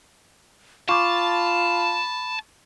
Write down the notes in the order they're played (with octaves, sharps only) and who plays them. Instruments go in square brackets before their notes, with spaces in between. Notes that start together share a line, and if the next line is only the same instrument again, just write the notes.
[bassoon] F4 [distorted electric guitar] A5 [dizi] B5 [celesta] C#6 D6